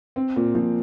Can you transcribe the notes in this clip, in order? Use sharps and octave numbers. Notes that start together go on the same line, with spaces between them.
C4
A#2
A#2 F3